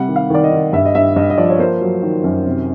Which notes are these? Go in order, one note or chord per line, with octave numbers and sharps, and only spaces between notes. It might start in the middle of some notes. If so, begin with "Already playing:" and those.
Already playing: C3 G3 F#5
D#3
F5
D#3 D5
D#5
D#3
G2 E5
D#5
G2 E5
G2 D#5
D#5
F3 D5
C#5
A#3 C5
F#3
D#3
F#2
C3